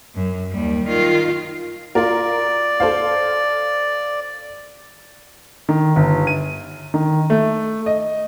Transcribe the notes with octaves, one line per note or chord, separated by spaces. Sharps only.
F#2
D#2 G3
D#3 F4
F4 A#4 D5
A4 C5 F5
D#3
G1
D#7
D#3
A3
D#5